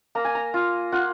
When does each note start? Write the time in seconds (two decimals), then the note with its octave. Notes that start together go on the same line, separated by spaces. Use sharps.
0.15 A#3 A#5
0.25 G#5
0.35 A#5
0.54 F4
0.92 F4 F#5